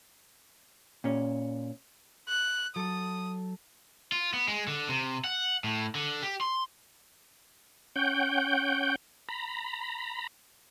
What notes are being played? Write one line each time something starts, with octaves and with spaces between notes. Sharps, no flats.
A#2 C#4
F#6
F#3 A4 D#6
F4
B3
G#3
D3
C3
F#5
A2
D3
G4
C6
C#4 F#5 G5 G6
A#5 B5